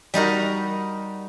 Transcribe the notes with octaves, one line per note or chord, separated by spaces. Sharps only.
G3 D#4 F#4 A#4